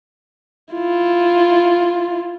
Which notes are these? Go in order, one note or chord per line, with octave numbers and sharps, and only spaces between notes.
E4 F4